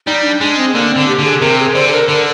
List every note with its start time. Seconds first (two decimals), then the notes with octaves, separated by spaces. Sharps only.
0.06 G3 D#4
0.24 D4
0.41 G#3 D4
0.58 C4
0.74 D3 A#3
0.90 C4
0.96 D3
1.08 G4
1.19 D3
1.25 G#4
1.41 C3 A#4
1.58 G#4
1.75 D3 C5
1.88 G#4
1.92 A#4
2.09 D3 A#4